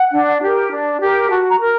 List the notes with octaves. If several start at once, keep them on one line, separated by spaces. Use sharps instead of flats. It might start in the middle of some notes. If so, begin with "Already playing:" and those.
Already playing: F#5
D4
G4 A#4
D4
G4 A#4
F#4 A5
A#5
A#4